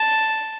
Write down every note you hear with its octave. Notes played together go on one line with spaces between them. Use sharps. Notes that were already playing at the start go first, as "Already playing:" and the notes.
Already playing: A5